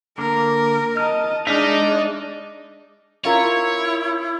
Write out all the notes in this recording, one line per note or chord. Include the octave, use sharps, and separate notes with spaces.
D3 A#3 A#4
D#5 A5 F6
G#3 D4 D#4 D5 E5 F6
C#4 E4 F4 A#4 C#5